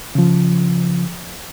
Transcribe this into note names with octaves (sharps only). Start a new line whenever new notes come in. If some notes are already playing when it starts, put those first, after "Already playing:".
C#3 F3